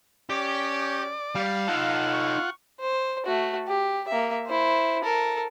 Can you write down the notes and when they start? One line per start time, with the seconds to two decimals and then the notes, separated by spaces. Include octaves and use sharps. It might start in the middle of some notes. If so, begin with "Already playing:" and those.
0.30 C#4 G4 D5
1.35 G3 F5
1.68 D#4 F4 A4 F#5
2.13 C#6
2.81 C5
3.26 A3 F#4
3.68 G4
4.08 A#3 E5
4.47 E4 C5
5.03 A4 A#4